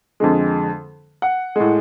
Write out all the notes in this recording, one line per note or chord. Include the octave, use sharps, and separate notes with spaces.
F2 D3 G#3
F#5
A2 G#3